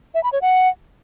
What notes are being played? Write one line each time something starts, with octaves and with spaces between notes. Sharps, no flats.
E5
B5
C#5
F#5